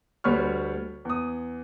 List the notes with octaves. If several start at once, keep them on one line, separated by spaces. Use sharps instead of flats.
D2 G3 B4 C#5 C#6 F6
E2 D#6